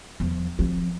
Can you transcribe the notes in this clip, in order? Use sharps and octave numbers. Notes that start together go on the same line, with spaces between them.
E2 F3
F3 C4